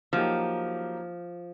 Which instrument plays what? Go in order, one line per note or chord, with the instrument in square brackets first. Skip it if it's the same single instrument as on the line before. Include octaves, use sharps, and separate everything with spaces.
[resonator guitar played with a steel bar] F3 [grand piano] F#3 A#3 D#4 G4